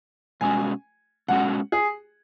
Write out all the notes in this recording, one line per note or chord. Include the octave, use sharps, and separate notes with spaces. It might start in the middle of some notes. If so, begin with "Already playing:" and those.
B2 G#3 C#4 F#4 G#5
B2 G#3 C#4 F#4 F#5
G#4